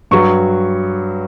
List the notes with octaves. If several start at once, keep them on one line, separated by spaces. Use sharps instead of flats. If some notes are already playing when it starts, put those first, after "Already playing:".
G2 F#3 C#6